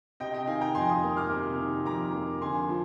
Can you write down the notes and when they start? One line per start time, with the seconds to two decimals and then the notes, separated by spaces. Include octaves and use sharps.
0.20 C3 D#5 G5
0.34 D#5 G5
0.47 D#3 F5 G#5
0.61 G5 A#5
0.75 F2 G#5 C6
0.89 C6 D#6
1.03 A#3
1.17 D6 F6
1.31 C3
1.59 D#3
1.86 F2 A#5 D6
2.13 A#3
2.42 D3 G#5 C6
2.69 F3